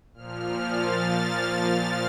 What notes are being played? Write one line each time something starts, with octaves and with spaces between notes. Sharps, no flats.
A#2 F3 F6
A6